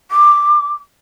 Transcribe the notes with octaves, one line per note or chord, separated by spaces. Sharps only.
D6